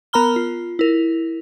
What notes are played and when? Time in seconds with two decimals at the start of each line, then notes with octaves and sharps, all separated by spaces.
0.13 B3 A#4 A#5 B5 F6 G7
0.36 F4
0.79 E4 A#4